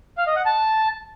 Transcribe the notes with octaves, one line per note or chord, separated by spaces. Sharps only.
F5
D#5
F#5
A5